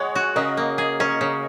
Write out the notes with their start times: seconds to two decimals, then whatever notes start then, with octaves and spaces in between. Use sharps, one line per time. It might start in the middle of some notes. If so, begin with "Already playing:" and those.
Already playing: G#3 C#5 D#5 F#5 G#5
0.15 F#4
0.36 C#3 A#4 D#5
0.57 A#3
0.78 G#4
1.00 C#4 A#4 D#5
1.21 C#3